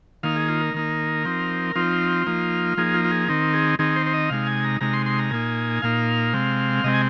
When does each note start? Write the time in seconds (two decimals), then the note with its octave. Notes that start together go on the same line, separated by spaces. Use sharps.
0.23 D#3 A#3 D#4 F5
0.36 G#4
0.48 F4
0.61 A#4
0.74 D#3 A#3 D#4
1.25 F3 C4 D#4
1.76 F3 C4 D#4 F4
2.27 F3 A#3 D#4
2.77 F3 A#3 D#4 G#4
2.94 F4
3.04 F4
3.11 G#4
3.28 D#3 C4 D#4 A#4
3.54 G#4
3.79 D#3 C4 D#4 G#4
3.96 C5
4.06 C5
4.13 D#5
4.30 C3 G#3 D#4 F5
4.47 G#5
4.64 A#5
4.81 C3 G#3 D#4 A#5
4.93 C6
5.06 C6
5.19 A#5
5.31 A#2 A#3 D#4 G#5
5.82 A#2 A#3 D#4 F5
6.33 C3 G#3 C4
6.84 C3 G#3 C4 D#5
6.94 G#5